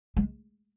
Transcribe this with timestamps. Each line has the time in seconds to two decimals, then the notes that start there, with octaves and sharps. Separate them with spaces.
0.17 G#3